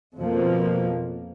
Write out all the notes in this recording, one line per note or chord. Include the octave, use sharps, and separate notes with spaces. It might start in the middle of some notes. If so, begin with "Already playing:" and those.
F2 B2 F3 A#3